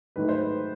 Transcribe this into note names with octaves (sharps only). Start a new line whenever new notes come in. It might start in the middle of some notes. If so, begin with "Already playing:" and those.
G#2 D#3 F#3 A3 B4
C5
B4